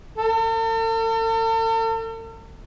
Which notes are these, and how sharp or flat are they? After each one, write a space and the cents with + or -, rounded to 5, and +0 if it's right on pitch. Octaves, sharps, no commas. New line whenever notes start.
A4 +45